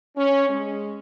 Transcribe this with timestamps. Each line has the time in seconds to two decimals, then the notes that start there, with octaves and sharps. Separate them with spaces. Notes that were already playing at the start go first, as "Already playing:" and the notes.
0.17 C#4
0.49 G#3